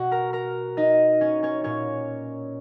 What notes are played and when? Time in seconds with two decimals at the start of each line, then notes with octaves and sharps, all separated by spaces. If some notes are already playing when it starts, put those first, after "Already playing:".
Already playing: B2 F#4 F#5
0.11 A#4 A#5
0.33 A#4 A#5
0.77 D#4 D#5
1.21 C#4 C#5
1.43 C#4 C#5
1.64 A#2 C#4 C#5